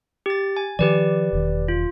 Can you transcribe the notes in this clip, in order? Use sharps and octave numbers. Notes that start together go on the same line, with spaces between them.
G4 A6
G#5
D#3 F3 G4 B4 D5
E1 D#3
F4